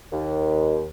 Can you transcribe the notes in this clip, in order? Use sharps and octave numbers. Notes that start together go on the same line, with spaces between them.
D#2